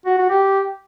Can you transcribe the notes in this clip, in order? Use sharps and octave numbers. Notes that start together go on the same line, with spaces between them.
F#4
F#4
G4